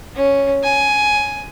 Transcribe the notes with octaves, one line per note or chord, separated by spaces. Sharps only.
C#4
G#5